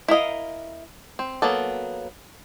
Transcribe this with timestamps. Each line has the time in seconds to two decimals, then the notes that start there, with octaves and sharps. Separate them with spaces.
0.08 E4 A#4 D#5 F5
1.19 C4
1.42 F#3 A#3 B3 A4